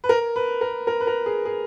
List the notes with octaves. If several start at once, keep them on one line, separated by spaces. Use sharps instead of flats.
B4
A#4
B4
A#4
A#4
B4
A#4
G#4
G#4